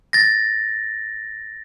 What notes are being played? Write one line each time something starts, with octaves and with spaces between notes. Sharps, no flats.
A6 A#6